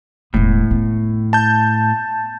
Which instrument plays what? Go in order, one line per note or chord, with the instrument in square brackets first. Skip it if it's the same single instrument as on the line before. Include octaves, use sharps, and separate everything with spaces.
[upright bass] E1 B3 [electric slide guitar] A2
[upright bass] B3
[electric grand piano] A5 G6